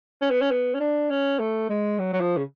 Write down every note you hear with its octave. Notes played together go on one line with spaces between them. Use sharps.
C#4
B3
C#4
B3
C#4
D4
C#4
A3
G#3
F#3
F#3
F3
C#3